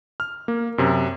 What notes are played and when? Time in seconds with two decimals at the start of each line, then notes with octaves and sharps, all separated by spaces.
0.20 F6
0.48 A#3
0.78 F#2 C3